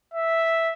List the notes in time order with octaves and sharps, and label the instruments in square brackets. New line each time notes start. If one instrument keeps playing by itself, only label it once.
[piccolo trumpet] E5